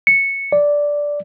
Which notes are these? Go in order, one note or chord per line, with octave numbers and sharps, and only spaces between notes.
C#7
D5